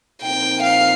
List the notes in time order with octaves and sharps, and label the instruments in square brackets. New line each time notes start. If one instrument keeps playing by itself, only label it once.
[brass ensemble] A#2 F3 C4 D#4 A#4 [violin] G5
[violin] F5